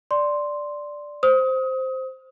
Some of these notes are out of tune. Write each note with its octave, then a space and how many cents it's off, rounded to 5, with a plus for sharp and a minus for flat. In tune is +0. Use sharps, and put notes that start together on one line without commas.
D5 +0 C6 +0
C5 +0 D#6 +25